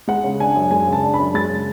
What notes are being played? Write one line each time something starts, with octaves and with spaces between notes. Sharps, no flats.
G#3 F#5
C#3
D4 G#5
F#2
G#3 G#5
C#3
A5
D4
F#2 B5
G#3 A6
C#3